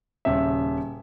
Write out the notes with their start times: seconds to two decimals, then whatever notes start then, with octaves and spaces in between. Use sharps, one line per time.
0.25 D#1 C#3 E5